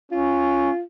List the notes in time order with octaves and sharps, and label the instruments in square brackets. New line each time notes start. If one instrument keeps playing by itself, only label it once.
[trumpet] C#4 [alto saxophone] F4